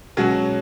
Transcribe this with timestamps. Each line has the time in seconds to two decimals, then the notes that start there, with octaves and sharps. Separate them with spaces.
0.17 B2 F#3 G#3 C#4 F#4 G#4